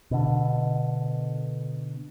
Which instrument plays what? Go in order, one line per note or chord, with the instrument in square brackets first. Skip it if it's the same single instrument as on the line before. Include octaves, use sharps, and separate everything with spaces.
[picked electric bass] B2 D3